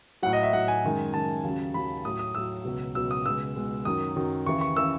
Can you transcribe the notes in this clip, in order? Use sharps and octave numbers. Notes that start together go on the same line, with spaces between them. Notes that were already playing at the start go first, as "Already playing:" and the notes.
A2 F#3 F#5
D#5
E5
A2 F#3 F#5
G#5
F#2 D#3 G#3
F#2 D#3 G#3 A5
D#2 C#3 F#3
D#2 C#3 F#3 B5
A2 F#3 D#6
D#6
A2 F#3 E6
C#2 B2 F#3
C#2 B2 F#3 E6
D#6
C#2 B2 G#3 E6
C#2 B2 G#3
F#2 D#3 F#3 D#6
F#2 D#3 F#3
D#2 C#3 E3 C#6
C#6
C#3 E3 E6